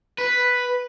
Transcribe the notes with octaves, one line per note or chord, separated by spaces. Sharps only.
B4